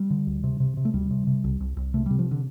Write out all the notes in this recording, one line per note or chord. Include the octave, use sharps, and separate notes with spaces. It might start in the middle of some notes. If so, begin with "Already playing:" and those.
Already playing: G3
D3
D2
C3
C3
C3
A3
D2 G3
C3
C3
C2
C2
C2
C3 A3
G3
C3
F3
D3